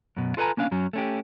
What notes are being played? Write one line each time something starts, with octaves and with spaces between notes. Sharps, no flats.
F#2 B2
F4 A4 B4 D5 G#5 A#5
A#3 C#4 D4 F5
F#2 F#3 C#4
A3 C#4 G4